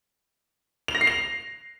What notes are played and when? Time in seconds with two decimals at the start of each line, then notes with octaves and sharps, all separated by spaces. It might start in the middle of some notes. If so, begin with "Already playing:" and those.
0.88 F7
0.95 A#6
1.01 C7
1.07 F7